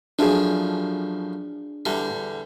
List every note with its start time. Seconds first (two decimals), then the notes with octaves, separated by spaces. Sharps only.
0.19 F#2 A2 F3 D4 G#4
1.85 E2 D3 G3